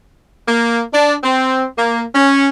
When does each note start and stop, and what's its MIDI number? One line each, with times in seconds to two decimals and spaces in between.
0.48 0.83 58
0.93 1.14 62
1.24 1.65 60
1.77 2.04 58
2.14 2.49 61